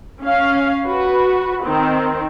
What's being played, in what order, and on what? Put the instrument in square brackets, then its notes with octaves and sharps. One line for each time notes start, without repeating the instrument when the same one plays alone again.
[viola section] C#4 F5
F#4 B4
D#3 C4